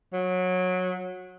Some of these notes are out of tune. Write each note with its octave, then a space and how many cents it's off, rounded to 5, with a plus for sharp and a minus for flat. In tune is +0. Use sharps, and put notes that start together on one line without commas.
F#3 -20